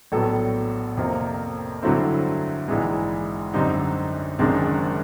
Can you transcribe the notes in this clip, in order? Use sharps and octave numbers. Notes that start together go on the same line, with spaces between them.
A#1 A2 F#3 B3 A4
F2 C3 F3 A#3
G2 D3 F#3 A3 C4 E4
A#1 G#2 E3 G#3
F#2 D3 G3 C4 D#4
F#1 F#2 D#3 G#3 C4 D4